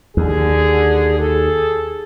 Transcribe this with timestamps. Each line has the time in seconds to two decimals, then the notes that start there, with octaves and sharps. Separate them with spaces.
0.17 D#2 D3 G#4
1.20 G#4 A4